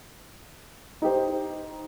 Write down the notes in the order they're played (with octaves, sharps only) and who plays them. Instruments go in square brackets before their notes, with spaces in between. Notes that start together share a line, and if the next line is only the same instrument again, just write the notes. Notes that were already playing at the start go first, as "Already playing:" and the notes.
[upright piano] D#4 G4 C5